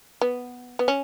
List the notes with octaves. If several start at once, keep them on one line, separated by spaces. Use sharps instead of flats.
B3
B3
C#4